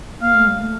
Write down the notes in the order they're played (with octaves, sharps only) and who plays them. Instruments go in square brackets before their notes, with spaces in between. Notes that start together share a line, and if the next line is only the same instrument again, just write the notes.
[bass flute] A#3 [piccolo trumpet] F5
[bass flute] A3
G3
A3